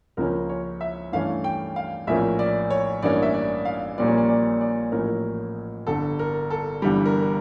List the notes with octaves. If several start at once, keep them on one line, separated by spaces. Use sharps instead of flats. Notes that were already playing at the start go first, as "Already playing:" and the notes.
C#2 C#3 F3 A#3 C#4 A#4
C#5
E5
G2 E3 A3 C#4 F5
G5
F5
A#1 A2 F3 A#3 C#4 E5
D5
C#5
A1 G2 E3 A#3 C#4 D5
E5
D5
F5
A#1 A#2 G3 A#3 C#4 D5
C#5
D5
D5
D5
A1 A2 F3 A#3 C#4 A#4
G1 G2 D3 A4
A#4
A4
G1 G2 E3 G3
A#4